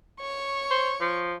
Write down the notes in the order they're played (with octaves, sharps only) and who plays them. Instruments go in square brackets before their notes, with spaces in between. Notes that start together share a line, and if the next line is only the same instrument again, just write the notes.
[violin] C#5 C#6
[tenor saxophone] C5
F3